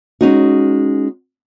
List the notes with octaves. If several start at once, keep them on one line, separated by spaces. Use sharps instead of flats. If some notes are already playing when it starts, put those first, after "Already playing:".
G#3 C#4 D#4 F#4